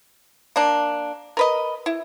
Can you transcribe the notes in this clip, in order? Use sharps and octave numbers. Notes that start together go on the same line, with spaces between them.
A#3 D4
A#4 B4 D#5
E4